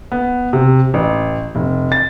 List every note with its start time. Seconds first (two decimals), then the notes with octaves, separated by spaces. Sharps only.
0.12 B3
0.53 C3
0.94 A1
1.55 F1
1.92 A6